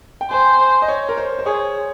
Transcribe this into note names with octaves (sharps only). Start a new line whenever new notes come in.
G5
C5 G#5
D#5
C#5
A#4
C5
C5
G#4 C#5